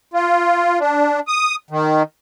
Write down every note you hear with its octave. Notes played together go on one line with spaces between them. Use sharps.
F4
D4
D#6
D#3